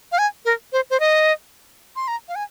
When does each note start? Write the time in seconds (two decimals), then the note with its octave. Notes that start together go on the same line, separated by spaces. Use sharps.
0.12 F5
0.18 G#5
0.45 A#4
0.72 C5
0.90 C5
1.00 D#5
1.96 C6
2.08 A#5
2.28 F5
2.35 G#5